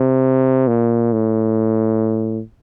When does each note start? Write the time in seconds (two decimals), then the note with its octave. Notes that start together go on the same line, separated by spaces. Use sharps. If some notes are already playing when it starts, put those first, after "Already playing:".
Already playing: C3
0.68 A#2
1.13 A2